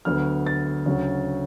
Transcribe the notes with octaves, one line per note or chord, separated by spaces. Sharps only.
D2 D3 F#3 B3 F6
A6
D2 C#3 F#3 C#4